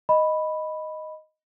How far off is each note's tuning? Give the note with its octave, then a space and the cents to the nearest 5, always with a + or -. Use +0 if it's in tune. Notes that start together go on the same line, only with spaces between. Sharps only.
D#5 +0 B5 +0